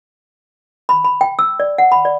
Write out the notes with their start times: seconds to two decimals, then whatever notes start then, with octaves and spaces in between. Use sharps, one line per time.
0.89 B5
1.05 B5
1.21 G5
1.39 E6
1.60 D5
1.78 F#5
1.92 B5
2.05 D5